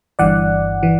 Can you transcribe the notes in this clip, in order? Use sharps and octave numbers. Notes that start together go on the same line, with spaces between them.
G1 G2 E3 D5 F#5
E3